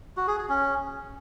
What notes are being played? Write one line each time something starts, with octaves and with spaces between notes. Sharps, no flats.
F#4
G#4
G#4
C#4